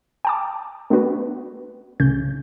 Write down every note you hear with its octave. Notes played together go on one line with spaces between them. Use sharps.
G5 A5 D6
A3 B3 C#4 D4 F#4 B4
C2 A2 C#3 C#4 G6